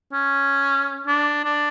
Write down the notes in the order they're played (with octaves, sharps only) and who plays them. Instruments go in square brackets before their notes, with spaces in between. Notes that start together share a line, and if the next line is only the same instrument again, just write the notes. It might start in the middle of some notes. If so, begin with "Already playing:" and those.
[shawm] C#4
D4
D4